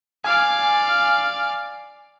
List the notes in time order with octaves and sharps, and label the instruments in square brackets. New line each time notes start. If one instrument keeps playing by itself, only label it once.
[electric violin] D5 F5 [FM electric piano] G#5